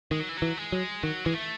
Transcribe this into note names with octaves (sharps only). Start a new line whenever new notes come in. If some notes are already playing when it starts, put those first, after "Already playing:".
D#3 G#3
F#3
E3
F#3
E3
G#3
F#3
D#3 F#3
E3 G#3
A3